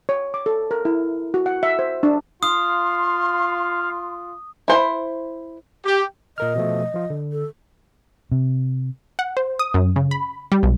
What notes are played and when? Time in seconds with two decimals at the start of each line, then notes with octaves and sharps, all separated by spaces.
0.09 C#5
0.34 D6
0.46 A4
0.71 A#4
0.85 E4
1.34 F#4
1.46 F#5
1.63 E5
1.79 C5
2.03 D4
2.43 F4 F5 C6 D#6
4.68 E4 C5 B5
5.85 G4
6.38 A#2 A#4 D#5 F6
6.55 B2 F3 A3
6.94 F3 F4
7.10 D3
7.32 A4
8.32 C3
9.19 F#5
9.37 C5
9.59 D#6
9.74 F#2
9.96 C#3
10.11 B5
10.52 G3
10.63 B1